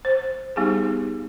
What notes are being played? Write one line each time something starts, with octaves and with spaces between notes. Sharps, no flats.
C5
G3 B3 D#4 G4 G#4